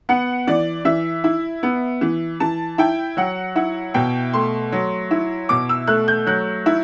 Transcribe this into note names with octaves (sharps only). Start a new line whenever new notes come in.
B3 F#5
E3 D5
E3 E5
E4
B3
E3
E3 A5
E4 G5
F#3 F#5
E4 F#5
B2 G5
A3 C6
F#3
E4
B2 D6
E6
A3 F#6
G6
F#3 F#6
E4